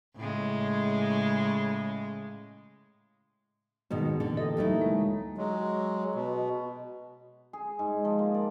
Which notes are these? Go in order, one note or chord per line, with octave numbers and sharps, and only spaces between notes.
A2 C#3 G#3
G#2 B2 D#3 B3
A#2 D3 E3 D4
G4 A4 D#5
D2 F#3 A3 A#3 D#4 E4
G#3
F#3 G#3
B2
G#4
G#2
F3
A#3
D5